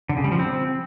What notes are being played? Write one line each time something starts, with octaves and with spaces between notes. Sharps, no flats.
D3
C#3
G3
F3
C4